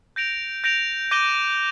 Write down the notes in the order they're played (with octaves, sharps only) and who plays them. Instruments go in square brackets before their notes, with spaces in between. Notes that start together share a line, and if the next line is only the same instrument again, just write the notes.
[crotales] G6 A#6 D7 F7
G6 A#6 D7 F7
D6 G6 A#6 D#7 G7